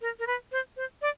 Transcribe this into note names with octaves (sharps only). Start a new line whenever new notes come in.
A#4
A#4
B4
C5
C5
D5